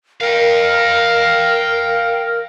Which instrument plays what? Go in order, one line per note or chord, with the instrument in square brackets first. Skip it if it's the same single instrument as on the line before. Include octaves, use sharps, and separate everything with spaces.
[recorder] A#4 [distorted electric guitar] F5 G5